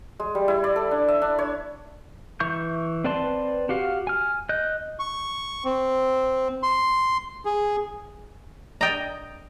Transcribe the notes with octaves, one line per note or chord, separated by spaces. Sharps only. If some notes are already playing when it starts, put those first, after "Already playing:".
G#3
G3
E4
D5
A4
D4
E5
D4
C#5
E3 E5 C#6 G6
C4 B4 D5 A5 C6
F#4 G4 F5
G#5 F6
D#5 F#6 G6
C#6
C4
C6
G#4
D5 D#5 G5 A#5 D#6